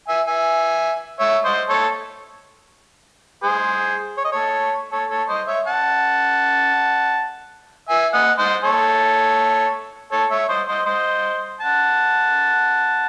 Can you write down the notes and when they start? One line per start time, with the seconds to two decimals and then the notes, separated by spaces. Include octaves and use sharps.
0.08 E5 G#5
0.27 E5 G#5
1.20 C#5 E5
1.45 C5 D#5
1.69 A4 C#5
3.43 G#4 C5
4.17 C#5
4.25 D#5
4.32 A4 C#5
4.92 A4 C#5
5.10 A4 C#5
5.29 C5 D#5
5.47 C#5 E5
5.66 F#5 A5
7.89 E5 G#5
8.13 D#5 F#5
8.38 C5 D#5
8.63 A4 C#5
10.12 A4 C#5
10.31 C#5 E5
10.49 C5 D#5
10.68 C5 D#5
10.86 C5 D#5
11.61 F#5 A5